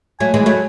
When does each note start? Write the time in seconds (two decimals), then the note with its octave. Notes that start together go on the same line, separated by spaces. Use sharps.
0.20 F#3 A3 G#5
0.34 E3 G#3
0.46 F#3 A3